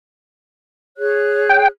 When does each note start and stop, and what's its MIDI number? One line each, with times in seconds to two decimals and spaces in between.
0.97 1.66 68
0.97 1.66 73
0.97 1.66 90
1.49 1.68 79